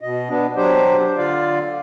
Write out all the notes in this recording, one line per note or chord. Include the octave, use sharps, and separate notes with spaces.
B2 D#5
B3 D4
F#3 D4 G4 C5
D3 F4 D5 F5